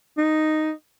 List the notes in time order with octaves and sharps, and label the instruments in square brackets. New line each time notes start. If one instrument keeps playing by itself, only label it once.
[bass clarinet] D#4